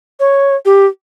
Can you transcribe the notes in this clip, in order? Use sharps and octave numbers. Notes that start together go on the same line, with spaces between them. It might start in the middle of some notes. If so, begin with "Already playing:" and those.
C#5
G4